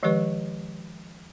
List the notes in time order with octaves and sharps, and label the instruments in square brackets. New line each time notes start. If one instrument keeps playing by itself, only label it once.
[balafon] D#3 F3 G#3 G4 B4 C#6